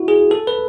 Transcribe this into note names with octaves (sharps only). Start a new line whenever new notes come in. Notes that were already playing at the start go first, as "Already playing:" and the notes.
Already playing: E4 F#4
G#4
A4
B4